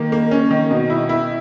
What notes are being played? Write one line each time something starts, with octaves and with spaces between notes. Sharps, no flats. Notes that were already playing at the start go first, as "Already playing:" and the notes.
Already playing: D#3 A#3
A#3
C#4
D#3
B2
E4
E4